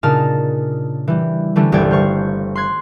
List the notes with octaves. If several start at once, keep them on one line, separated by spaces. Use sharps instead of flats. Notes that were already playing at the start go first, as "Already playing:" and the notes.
A#2 C#3 D4 D#4 A5 F6
E3 G3
D3 E3 G3 A3 C#4 D4
G1 C2 G3 D5 G5 G#6
C5 F5 C#6
C6 F#6 G#6